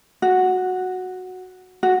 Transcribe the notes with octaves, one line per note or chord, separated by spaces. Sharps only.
F#4
F#4